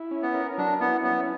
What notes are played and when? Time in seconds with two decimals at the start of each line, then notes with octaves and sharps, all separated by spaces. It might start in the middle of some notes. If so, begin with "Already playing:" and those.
Already playing: E4
0.11 C#4
0.23 B3
0.34 A#4
0.58 F#3 D4
0.80 B3 E4
1.03 B3 C#4